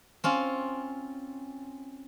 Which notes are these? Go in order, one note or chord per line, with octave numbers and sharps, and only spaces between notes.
C4 C#4 F4